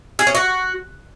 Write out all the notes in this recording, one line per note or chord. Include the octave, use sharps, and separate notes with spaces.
G#4
C#4
F#4